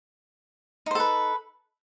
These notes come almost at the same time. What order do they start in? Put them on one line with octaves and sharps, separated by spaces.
D#4 C5 A4 B4